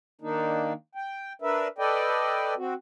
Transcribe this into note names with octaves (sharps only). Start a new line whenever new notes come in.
D#3 A#3 D4 D#4
G5
D4 A#4 B4 E5
A4 B4 D5 D#5 G5
C4 F#4